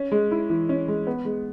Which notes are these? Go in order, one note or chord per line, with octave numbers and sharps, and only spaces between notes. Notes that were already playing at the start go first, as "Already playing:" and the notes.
Already playing: C#4
G#3
E4
E3
C#4
G#3
B3
G#3